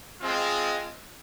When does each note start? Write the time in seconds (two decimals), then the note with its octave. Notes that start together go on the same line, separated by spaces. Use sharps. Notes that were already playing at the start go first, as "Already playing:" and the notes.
0.21 G#3 C4 F4